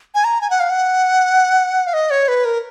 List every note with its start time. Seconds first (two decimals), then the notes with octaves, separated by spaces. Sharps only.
0.15 G#5
0.24 A#5
0.41 G#5
0.50 F#5
0.60 F5
0.70 F#5
1.87 F5
1.94 D#5
2.11 C#5
2.28 B4
2.45 A#4